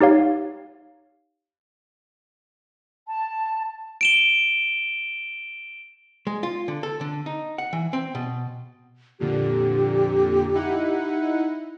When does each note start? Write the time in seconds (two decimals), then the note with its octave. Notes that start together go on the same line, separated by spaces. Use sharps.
0.01 D#4 G4 C#5 F5
3.07 A5
4.01 D7 E7 G7
6.27 G#3
6.43 F4
6.68 D3
6.83 A4
7.01 D3
7.26 D#4
7.58 F#5
7.73 E3
7.93 C4
8.15 B2
9.20 F2 A#2 D3 G4
10.54 D#4 E4 F#5